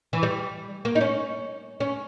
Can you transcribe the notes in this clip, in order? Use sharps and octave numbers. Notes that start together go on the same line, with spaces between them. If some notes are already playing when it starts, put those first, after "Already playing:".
E3
G3
A#3
D#4
C#4
C#4